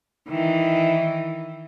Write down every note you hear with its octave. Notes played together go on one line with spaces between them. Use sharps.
D#3 E3